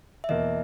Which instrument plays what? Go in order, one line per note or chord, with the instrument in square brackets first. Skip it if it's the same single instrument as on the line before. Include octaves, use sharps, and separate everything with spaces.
[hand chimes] E5
[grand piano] E2 B2 A#3 [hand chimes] D#5